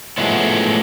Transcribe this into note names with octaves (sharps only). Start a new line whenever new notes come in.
A2 F3 F#3 G#3 A3 B3